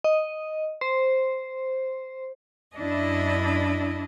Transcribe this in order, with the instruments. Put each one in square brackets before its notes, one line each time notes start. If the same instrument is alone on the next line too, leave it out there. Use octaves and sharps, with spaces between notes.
[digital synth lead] D#5
C5
[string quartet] F#2 D#5 [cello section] D4 E4